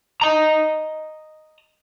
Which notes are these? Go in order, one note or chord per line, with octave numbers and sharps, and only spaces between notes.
D#5 A#5